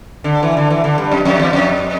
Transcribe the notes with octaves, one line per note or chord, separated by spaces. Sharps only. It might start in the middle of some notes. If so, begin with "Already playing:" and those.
D3
E3
D3
E3
D3
G2
F2
F2
E2
F2